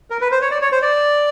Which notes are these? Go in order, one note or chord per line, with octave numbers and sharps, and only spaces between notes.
A#4
B4
C5
C#5
D5
C#5
C5
D5